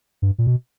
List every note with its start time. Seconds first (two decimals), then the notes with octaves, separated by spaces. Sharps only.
0.22 G2
0.38 A#2
0.47 B2